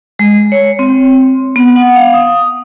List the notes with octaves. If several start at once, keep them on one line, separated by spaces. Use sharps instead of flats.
G#3
C#5
C4
B3
F#5
F5
D#6